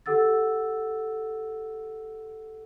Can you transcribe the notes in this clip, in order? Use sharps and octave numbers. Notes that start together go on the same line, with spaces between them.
G4 A4 F#5 E6 A6